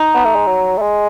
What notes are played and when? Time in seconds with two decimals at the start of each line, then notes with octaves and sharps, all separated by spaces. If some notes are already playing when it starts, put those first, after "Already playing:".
Already playing: D#4
0.14 B3
0.25 A3
0.35 G#3
0.47 F#3
0.78 A3
0.82 G#3